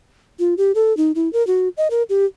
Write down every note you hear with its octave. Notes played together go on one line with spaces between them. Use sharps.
F4
G4
A4
D#4
E4
A#4
F#4
D#5
A#4
G4